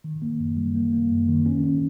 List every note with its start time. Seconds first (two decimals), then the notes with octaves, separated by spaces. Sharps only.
0.04 D#3
0.22 A#3
0.40 F#2
0.57 G3
0.75 A#3
0.93 A#3
1.11 F#2
1.29 D#3
1.46 C#4
1.64 C#4